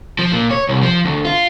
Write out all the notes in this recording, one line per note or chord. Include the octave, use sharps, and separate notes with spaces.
F3
A#2
C#5
C2
F3
D2
F4